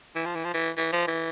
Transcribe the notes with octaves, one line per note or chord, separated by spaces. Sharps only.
E3
F3
E3
F3
E3
E3
F3
E3